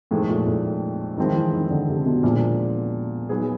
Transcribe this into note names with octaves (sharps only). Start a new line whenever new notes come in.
F2 A2 C3 D#3 G#3
A#2
A2
A2 D#3 F3 G#3 C4 E4
E3
D#3
D3
C3
B2
D#2 A#2 D3 F3 G#3
F#3 B3 D#4 G#4